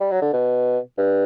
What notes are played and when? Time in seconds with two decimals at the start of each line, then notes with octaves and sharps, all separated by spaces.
0.01 G3
0.11 F#3
0.22 D3
0.33 B2
0.98 G2